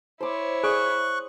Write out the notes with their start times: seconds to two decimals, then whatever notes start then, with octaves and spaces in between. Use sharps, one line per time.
0.21 E4 C5 C#5 D6
0.63 G#4 D5 G#5 C#6 D#6 F#6